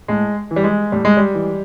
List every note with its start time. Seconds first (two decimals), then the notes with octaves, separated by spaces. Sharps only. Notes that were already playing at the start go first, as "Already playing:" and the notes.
0.08 A2 G#3
0.51 E3
0.56 G3
0.64 G#3
0.92 A2 G3
1.05 G#3
1.17 G3
1.34 E3